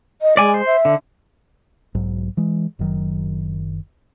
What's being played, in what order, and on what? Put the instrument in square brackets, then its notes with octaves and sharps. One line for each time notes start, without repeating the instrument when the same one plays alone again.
[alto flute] D#5
[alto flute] G#3 [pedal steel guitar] D5 G#5
[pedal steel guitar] C5
[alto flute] E5
[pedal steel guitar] D3
[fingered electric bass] B1 G#2 F#3
E3 G#3
F#1 F#2 D#3 F#3